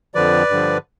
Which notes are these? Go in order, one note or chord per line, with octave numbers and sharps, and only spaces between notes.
F2 D3 F3 B4 D5
G2 D3 F3